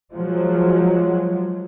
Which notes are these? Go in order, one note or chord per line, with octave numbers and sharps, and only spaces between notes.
F3 F#3 G#3